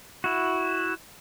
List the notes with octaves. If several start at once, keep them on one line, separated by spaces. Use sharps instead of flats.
E4 F#4